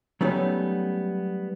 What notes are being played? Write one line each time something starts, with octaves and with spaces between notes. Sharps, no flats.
F#3 G3 A3 B3 C#4 D#4